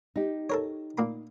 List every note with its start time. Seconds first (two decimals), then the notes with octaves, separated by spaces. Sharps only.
0.16 D#4 G4
0.50 A4 A#4 C#5
0.98 A#2 A#3 B5